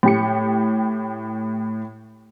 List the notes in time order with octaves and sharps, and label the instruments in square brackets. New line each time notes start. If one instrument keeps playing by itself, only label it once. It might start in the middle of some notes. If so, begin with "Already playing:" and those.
[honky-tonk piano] A2 G4 C#7